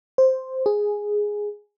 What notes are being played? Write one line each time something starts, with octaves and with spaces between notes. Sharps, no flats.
C5
G#4